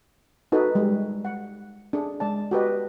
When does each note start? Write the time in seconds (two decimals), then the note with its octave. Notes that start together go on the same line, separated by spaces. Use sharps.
0.52 D#4 F#4 A4 B4
0.75 G3 G#3
1.25 F#5
1.93 D4 G#4
2.20 G#3 D5 A5
2.51 F#4 G4 B4 D#5